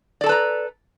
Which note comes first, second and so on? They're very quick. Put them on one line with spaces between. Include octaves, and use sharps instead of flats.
D5 A4 A5 B4 A#5